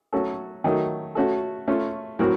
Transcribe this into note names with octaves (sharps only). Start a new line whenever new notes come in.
F#3 A3 C#4 F#4 A4
D#3 F#3 A3
A3 C#4 F#4 A4
A3 C#4 F4
A2 F#3 C4 F#4 A#4